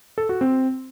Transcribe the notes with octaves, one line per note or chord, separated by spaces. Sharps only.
A4
F#4
C4